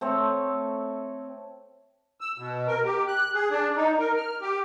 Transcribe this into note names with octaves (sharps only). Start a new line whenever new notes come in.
A3 C4 A4 C#5
E6
B2
A#4
G4
F#6
G#4
D4
D#4
A#4
F6
G4